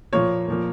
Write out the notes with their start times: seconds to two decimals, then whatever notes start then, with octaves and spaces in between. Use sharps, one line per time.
0.13 A#2 F3 A#3 C#5
0.47 A#2 F3 A#3